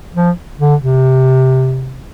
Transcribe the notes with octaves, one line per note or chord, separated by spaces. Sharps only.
F3
D3
C3